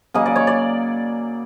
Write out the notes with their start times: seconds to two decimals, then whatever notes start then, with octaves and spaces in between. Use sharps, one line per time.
0.14 C#3 F#3 A#3 D#5
0.26 D5
0.36 C#5
0.47 D5